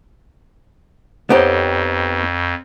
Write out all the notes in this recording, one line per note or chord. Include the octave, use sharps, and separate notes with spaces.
F2 B3 D#4 G4 A4 C5 C#5